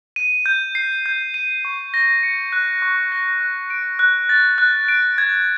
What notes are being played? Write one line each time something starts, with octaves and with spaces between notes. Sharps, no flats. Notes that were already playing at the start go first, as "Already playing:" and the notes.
D#7
G6
C7
G6
D#7
C#6
A#6
C#7
F#6
C#6
A#6
F#6
D7
F#6
A6
F#6
D7
G#6